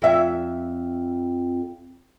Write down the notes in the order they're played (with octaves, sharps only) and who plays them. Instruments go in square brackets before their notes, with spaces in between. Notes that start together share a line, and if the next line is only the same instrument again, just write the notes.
[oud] F2 E5